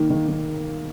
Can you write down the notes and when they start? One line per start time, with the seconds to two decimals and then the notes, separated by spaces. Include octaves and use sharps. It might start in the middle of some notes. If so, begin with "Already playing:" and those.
Already playing: D#3 A#3
0.10 D#3
0.28 D#3